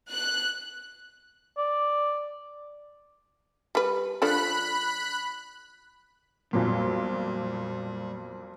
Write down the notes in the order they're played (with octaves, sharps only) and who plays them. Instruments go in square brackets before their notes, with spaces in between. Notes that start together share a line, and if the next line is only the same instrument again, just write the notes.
[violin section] F#6
[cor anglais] D5
[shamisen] G3 B4
[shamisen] F3 D4 A4 [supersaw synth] B5 F#6
[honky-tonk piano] B1 F2 A#2 [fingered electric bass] G3